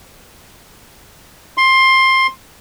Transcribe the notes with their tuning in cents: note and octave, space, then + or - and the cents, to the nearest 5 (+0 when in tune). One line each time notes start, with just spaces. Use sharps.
C6 +15